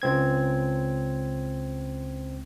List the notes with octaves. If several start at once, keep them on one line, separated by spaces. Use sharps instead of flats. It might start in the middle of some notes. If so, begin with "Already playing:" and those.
C#2 C4 G#6